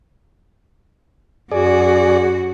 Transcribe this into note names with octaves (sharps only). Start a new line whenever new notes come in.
F#2 F#4 G#4 D5